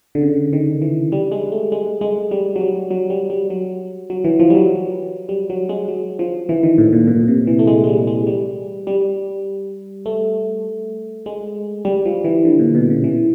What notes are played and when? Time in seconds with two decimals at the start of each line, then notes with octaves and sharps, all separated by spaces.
0.15 D3
0.22 C#3
0.53 D#3
0.82 E3
1.12 G3
1.32 G#3
1.52 A3
1.72 G#3
2.01 G#3
2.31 G3
2.56 F#3
2.61 G3
2.91 F#3
3.10 G3
3.30 G3
3.50 F#3
4.10 F#3
4.24 E3
4.40 F3
4.50 G3
4.55 F#3
5.29 G3
5.50 F#3
5.69 G#3
5.88 F#3
6.19 F3
6.49 E3
6.63 D#3
6.78 A2
6.93 A#2
7.07 A#2
7.28 C3
7.47 E3
7.59 A3
7.67 G#3
7.84 G#3
7.87 G3
8.07 G#3
8.27 G3
8.87 G3
10.06 A3
11.26 G#3
11.85 G3
12.06 F3
12.24 E3
12.45 D3
12.59 A#2
12.75 B2
12.90 C#3
13.04 E3